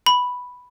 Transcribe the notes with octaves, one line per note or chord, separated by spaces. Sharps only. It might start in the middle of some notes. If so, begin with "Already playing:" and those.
B5